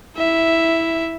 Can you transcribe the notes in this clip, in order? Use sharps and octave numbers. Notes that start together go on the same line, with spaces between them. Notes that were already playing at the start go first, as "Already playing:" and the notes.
E4 E5